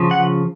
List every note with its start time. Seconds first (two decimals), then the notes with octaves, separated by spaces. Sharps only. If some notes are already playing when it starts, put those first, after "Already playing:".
Already playing: C#3 F3
0.11 F#5